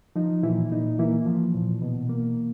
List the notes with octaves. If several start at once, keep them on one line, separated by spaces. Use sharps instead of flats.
F3 D#4
A#2 E3 E4
A#2 D#4
E3 A#3 E4
F3
A#2
B2
A#3